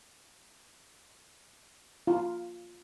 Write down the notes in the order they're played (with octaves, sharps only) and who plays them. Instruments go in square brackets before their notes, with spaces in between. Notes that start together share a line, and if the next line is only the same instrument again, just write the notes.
[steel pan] F4